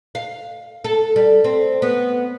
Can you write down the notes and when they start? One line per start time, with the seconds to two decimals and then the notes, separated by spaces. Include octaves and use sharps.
0.15 F5
0.84 A4
1.16 G3
1.44 C4
1.82 B3